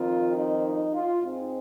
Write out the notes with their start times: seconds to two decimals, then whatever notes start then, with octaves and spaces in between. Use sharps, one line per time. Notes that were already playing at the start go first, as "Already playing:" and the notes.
Already playing: F2 D#3 C4 F4
0.34 D#4
0.64 D#4
0.93 F4
1.22 G#2 G#3 C4 D#4